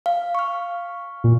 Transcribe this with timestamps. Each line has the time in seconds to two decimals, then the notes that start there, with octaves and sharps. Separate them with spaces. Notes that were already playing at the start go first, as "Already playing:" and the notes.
0.06 F5
0.35 C#6 F6
1.24 A#2